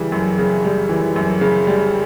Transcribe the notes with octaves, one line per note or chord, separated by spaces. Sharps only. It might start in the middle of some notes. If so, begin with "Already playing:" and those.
Already playing: C#3 E3 G3
F#2
C#3
G3
E3
F#2
C#3
G3